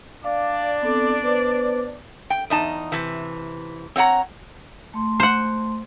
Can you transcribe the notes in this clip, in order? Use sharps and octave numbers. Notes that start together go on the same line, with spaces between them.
D4 D5 F5
B3 C4 A4
B3 B4 C5
G5
E2 D#4 A5
C3 E3
C4 C#5 F#5 A#5
A3 C6
C5 F#5